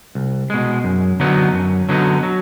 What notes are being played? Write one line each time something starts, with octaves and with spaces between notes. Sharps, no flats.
C2
B2 G#3
F#2
D3 F#3 B3 D#4
F#2
D3 F#3 B3 D#4
F#3